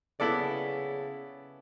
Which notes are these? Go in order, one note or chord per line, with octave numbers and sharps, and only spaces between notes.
C#3 B3 E4 A4 D5